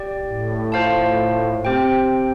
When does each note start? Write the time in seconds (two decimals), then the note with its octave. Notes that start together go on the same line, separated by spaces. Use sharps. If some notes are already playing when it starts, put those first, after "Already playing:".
Already playing: G4 D5 G5
0.25 A2
0.72 F4 C5 F5 A5
1.65 C4 G4 C5 G5